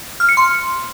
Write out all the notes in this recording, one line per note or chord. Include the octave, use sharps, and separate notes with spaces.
F6
C#7
C6